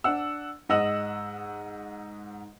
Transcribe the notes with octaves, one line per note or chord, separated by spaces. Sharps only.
D4 F#5 E6
G#2 D#5 F#5 E6 F#7